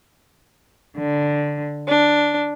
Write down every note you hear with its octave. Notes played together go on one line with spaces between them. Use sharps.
D3
D4